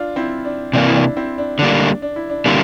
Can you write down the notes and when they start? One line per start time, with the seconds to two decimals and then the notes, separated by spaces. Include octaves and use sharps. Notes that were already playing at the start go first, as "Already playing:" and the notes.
Already playing: D4 F4
0.16 C4 E4
0.45 D4
0.73 C3 E3 A#3 D4
0.87 E4
0.95 D4
1.17 C4 E4
1.38 D4
1.59 D3 G3 A#3 D4
2.02 D4
2.16 E4
2.30 D4
2.45 D3 G3 A#3 C4 E4